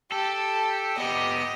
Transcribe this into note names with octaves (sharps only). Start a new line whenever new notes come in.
G4 A4
B3 G4 D#5